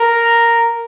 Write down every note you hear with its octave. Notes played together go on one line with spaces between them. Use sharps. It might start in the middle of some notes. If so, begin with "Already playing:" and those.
Already playing: A#4